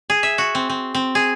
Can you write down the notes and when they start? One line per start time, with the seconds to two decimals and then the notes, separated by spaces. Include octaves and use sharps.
0.10 G#4
0.23 E5
0.38 F#4
0.55 C4
0.70 C4
0.95 C4
1.15 G#4